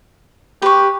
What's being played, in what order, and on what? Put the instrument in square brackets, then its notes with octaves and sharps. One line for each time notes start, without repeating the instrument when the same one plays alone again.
[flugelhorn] G4 [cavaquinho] B4 C#6